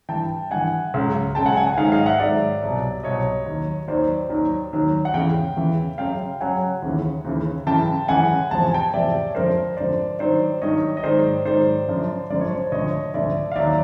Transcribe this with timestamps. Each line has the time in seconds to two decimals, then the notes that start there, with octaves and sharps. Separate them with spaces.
0.09 G2 E3 G5 A5
0.51 G2 E3 F#5 G#5
0.94 C#2 C#3 F#3
1.35 C#2 C#3 F#3 G5 A5
1.46 F#5 G#5
1.56 F#5 G#5
1.67 F#5 G#5
1.77 G#2 D#3 F#3 F5 G5
1.85 F#5
1.92 D#5 F5
2.06 E5 F#5
2.19 G#2 D#3 F#3 D5 E5
2.62 C2 B2 F#3
3.03 C2 B2 F#3 C#5 D#5
3.46 D#2 D#3 F#3
3.88 D#2 D#3 F#3 C5 D5
4.30 D#2 D#3 F#3
4.73 D#2 D#3 F#3
5.05 F#5
5.14 E2 C#3 E3 F5 G5
5.57 E2 C#3 E3
5.98 F#2 C#3 F#3 F5 G5
6.41 F#2 C#3 F#3 F#5 G#5
6.82 D#2 C#3 E3
7.25 D#2 C#3 E3
7.67 F#2 C#3 E3 G5 A5
8.08 F#2 C#3 E3 F#5 G#5
8.51 E2 C3 F3 A5
8.63 G#5
8.74 G5 A5
8.94 E2 C3 F3 D5 E5
9.29 C#5
9.35 F2 D3 F3 A#4 C5
9.77 F2 D3 F3 C5 D5
10.19 G2 D#3 F#3 C5 D5
10.61 G2 D#3 F#3 C#5 D#5
10.97 D#5
11.03 G#2 D#3 F#3 C5 D5
11.45 G#2 D#3 F#3 C5 D5
11.88 F#2 D3 F3
12.30 F#2 D3 F3 D5
12.41 C#5
12.50 C5 D5
12.72 D2 D3 F3 C#5 D#5
13.14 D2 D3 F3 D5 E5
13.52 F5
13.56 D#2 D#3 F#3 D5 E5